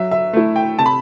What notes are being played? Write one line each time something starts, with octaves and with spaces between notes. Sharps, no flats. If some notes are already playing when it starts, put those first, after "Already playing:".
Already playing: F#3 E5
E5
A3 E4
G5
C3 A5
B5